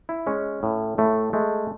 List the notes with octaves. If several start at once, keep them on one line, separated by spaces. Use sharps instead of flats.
E4
G#3 C#4
A2
A2 A3
G#3 A3